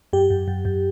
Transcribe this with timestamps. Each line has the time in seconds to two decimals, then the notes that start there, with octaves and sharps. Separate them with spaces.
0.13 F#2 G4
0.30 F#2
0.48 F#2
0.65 F#2